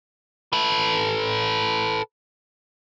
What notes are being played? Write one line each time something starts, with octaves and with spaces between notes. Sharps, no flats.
A4 B4